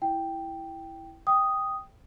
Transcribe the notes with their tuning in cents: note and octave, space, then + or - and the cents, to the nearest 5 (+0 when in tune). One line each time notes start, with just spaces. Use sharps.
E4 +5 G5 +0
G5 +0 D#6 +0